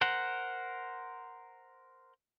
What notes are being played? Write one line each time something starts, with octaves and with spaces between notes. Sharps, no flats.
A#4 C5 F#5